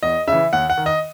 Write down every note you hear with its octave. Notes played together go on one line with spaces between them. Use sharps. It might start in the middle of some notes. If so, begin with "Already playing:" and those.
E2 D#5
C#3 E3 E5
D#2 F#5
F#5
D#3
D#5